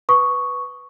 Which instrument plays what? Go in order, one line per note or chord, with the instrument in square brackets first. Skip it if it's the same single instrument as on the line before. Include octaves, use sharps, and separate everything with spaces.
[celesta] B4 C#6 D#6